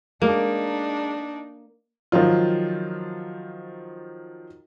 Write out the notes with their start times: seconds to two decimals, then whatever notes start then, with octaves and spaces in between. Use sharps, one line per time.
0.22 G#3 A#3 D4 D#4
2.12 D#3 F3 F#3 F4